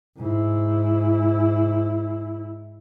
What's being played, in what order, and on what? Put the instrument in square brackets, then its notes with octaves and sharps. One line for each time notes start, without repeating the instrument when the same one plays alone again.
[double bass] G#2 E4